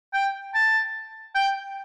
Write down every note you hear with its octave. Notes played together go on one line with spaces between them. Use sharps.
G5
A5
G5